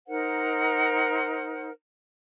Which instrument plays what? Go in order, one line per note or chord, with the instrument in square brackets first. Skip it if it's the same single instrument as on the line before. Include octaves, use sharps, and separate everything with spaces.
[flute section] D#4 A#4 C5 F#5